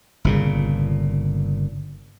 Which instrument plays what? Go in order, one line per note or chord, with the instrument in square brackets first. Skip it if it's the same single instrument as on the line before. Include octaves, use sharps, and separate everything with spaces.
[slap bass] G1 A#2 C#3